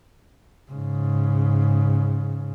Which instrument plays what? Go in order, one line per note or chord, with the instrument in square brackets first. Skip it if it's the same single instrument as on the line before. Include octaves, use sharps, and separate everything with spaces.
[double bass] G#2 C#3